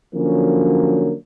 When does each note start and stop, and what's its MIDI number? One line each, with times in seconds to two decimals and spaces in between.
0.15 1.12 50
0.15 1.12 53
0.15 1.12 54
0.15 1.12 58
0.15 1.12 61